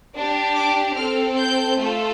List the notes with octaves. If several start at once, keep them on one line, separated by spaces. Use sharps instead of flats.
D4 G4
D6
C4 A4 F6
G6
A3 F4 A4